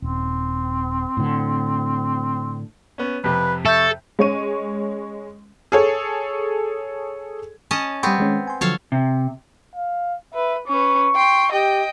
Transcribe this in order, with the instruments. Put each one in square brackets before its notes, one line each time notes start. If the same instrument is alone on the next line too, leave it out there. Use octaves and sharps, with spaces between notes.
[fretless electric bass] D#1 [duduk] C4
[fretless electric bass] A2 D3
[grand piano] B3 C#4
[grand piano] F2 C3 [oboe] B4
[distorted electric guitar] A4 [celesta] E5 G6 [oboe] C#6
[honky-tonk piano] G#3 C#4 C#5 C#6 D#7
[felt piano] G#4 A4 C#5
[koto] C#4 D#5 A5
[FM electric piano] G3 C#6 [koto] B3 C4
[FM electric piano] D#3 G#3 C#4
G#5 C6
[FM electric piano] D3 F3 F#3 [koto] A4 C#5 F5
[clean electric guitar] C3
[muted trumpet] F5
[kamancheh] B4 [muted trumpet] E5
[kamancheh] C#4 B4 [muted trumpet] C#6
[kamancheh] G5 C6
[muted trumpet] G4 [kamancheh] D#5 G5